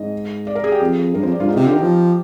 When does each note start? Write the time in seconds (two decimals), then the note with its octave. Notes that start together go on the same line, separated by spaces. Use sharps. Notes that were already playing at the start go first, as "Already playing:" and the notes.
Already playing: G#2 D#5
0.47 D5
0.55 A#4
0.64 G#4
0.72 G4
0.80 F2 G#4
1.14 G2 A#4
1.23 F2 C5
1.32 D5
1.40 G2 F4
1.48 G#2 D#4
1.56 C3 F4
1.66 D3 G4
1.73 D#3 A#4
1.82 F3